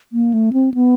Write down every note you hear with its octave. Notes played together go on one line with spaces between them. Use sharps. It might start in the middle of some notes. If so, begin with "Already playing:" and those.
A#3
A3
C4
B3